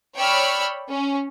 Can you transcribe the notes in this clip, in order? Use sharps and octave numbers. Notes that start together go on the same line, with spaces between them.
C#5 D5 G5 B5 E6 F6
C#4